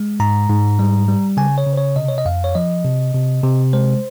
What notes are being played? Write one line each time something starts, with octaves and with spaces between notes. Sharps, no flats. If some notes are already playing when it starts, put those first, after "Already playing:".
Already playing: G#3
G#2 A#5
G#2
G3
G3
C#3 G#5
C#5
C#3
C5
C#5
C3 D#5
C#5
D#5
F2 F5
C#5
F3 D#5
C3
C3
C3
G#3 C5